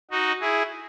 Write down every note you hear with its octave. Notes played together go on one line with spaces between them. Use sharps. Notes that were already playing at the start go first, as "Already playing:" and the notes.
D#4 F#4
E4 G#4